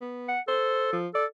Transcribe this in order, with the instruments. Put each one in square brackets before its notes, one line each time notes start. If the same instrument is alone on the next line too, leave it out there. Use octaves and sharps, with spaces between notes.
[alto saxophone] B3
[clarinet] F#5
[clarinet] A4 [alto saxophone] C5
[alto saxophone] F3
[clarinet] A4 [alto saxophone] D5